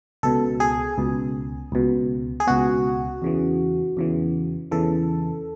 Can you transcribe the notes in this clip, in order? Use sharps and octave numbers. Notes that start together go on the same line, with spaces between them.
C#2 B2 A4
G#4
C#2 B2
C#2 B2
G#4
C#2 B2 F#4
E2 C#3 E3
E2 C#3 E3
E2 C#3 E3 A4